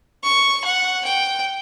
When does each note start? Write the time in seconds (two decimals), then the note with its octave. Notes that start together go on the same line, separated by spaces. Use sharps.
0.24 C#6
0.65 F#5
1.05 G5